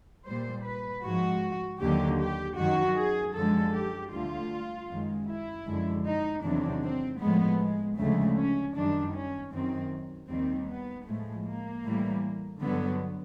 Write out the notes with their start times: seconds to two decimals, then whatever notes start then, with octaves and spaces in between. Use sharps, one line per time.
0.26 A#2 G3 C5
0.64 B4
1.03 G#2 F3 G#3 F#4
1.81 D#2 D3 F#3 G4
2.20 G4
2.57 F#2 D#3 F#3 F#4
2.96 G#4
3.34 F#2 D3 F3 G#3 A4
3.73 G4
4.11 D2 D3 G3 F4
4.90 F#2 D#3 G#3
5.28 E4
5.66 F#2 D3 F3 G#3
6.05 D#4
6.43 E2 C3 D#3 F#3 D4
6.82 C4
7.20 A2 F3 G#3 B3
7.59 G#3
7.97 D2 C#3 F3 G#3 A3
8.37 C#4
8.75 F#2 D#3 G3 D4
9.14 C#4
9.52 F#2 D#3 F#3 C4
10.29 D#2 D#3 G3 C4
10.68 B3
11.06 A2 F3 G#3 A3
11.44 A#3
11.83 A2 E3 G3
12.61 G2 D3 F#3 B3